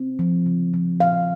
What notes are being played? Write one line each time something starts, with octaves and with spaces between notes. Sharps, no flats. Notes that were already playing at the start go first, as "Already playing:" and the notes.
Already playing: C4
F3
C#3
F3
A#2 F5